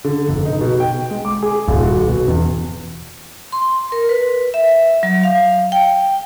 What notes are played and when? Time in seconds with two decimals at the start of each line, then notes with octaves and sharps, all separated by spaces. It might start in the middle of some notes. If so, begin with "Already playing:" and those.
0.04 D3
0.29 F1
0.45 D#4
0.61 B2
0.80 G5
1.11 G#3
1.25 D6
1.42 G#4
1.67 D#1
1.85 F#4
2.08 B2
2.28 E2
3.52 C6
3.92 A#4
4.09 B4
4.54 E5
5.03 F#3
5.23 F5
5.72 G5